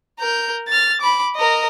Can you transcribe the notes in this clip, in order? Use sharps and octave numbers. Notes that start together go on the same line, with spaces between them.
A#4 G6
F6 A6
B5 D6
A#4 D#5